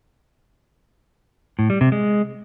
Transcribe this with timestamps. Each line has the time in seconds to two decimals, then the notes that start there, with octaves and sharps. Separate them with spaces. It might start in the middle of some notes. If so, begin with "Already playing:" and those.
1.59 A2
1.70 G3
1.81 C3
1.92 G#3